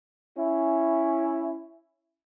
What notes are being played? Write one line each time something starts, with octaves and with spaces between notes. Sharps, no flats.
C#4 E4